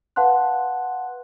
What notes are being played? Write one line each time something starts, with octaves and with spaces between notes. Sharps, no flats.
B4 F5 F#5 A5 C6 F#6